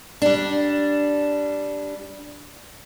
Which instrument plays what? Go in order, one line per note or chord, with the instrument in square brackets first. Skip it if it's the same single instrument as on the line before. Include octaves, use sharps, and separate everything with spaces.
[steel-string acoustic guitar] G3 D4